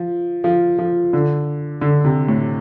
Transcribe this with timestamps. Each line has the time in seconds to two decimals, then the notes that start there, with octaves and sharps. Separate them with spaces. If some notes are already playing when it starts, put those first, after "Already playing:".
Already playing: F3
0.44 F3
0.78 F3
1.13 D3
1.81 D3
2.05 C3
2.28 A2